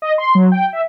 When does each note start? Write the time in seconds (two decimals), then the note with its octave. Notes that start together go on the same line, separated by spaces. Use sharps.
0.02 D#5
0.18 C6
0.35 F#3
0.52 G5
0.73 E5